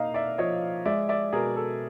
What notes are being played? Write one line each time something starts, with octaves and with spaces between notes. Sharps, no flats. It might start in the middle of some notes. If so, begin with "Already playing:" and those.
Already playing: A#3 D#4 D#5 F5
D5 E5
F3 C#5 D#5
G#3 D5 E5
D5 E5
B2 G#4 A#4
A4